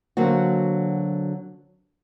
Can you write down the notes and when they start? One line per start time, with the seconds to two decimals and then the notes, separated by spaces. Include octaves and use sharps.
0.17 D3 F#3 A#3 C4 F#4